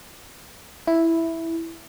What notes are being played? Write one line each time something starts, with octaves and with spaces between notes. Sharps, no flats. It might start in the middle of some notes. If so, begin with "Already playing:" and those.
E4